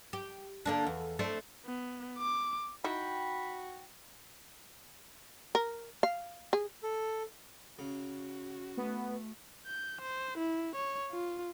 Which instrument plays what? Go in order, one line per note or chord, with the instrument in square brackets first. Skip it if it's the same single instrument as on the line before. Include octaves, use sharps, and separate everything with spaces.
[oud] G4
D3 A#3 D4
E2
A3 C4 D4
[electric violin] B3
D6
[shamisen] D#4 E4 [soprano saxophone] F#4 [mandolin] G5 [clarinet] B5
[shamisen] A#4
F5
G#4
[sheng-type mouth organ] A4
[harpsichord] C#3 [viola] F#4
[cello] A3 [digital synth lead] B3
[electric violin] G6
C5
E4
C#5
F4